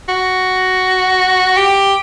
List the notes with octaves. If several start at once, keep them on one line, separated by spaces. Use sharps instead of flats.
F#4
G4